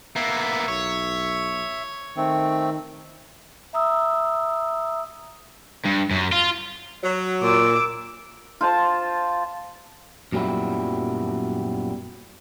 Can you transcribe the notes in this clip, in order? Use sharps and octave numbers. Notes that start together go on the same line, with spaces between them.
A#3 B3 E5
B1 C#5
D#3 A3 C4
E5 A#5 D#6 E6
G2
F#2
F4
F#3
A#2 D6 E6
F4 C5 A5
F#2 A#2 F#3 G3 B3 E4